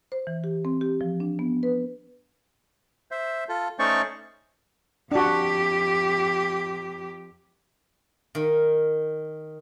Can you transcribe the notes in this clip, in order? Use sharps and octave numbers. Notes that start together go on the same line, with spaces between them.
C5
E3
G4
C4
G4
F3
D4
B3
B4
C5 E5
F4 A4
A3 C#4 D#4 C5 D5 C#6
F2 D4 F#4 G4
D#3